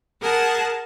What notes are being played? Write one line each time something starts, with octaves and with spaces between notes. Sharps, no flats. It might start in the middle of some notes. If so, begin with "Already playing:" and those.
G#4 A#4 F#5 A5